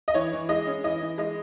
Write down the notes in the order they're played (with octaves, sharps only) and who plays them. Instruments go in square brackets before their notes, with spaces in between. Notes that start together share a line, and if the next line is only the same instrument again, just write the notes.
[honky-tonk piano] D#5
E3 C#5
E3
G#3 D#5
C#4
E3 D#5
E3
G#3 D#5